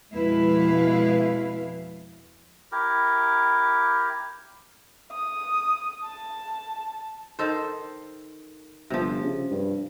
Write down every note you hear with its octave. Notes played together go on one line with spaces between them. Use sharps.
F2 B2 G#3 E4 B4 F5
E4 G4 A#4
D#6
A5
D#3 A4 C5
G1 C3 F3
C#3
G2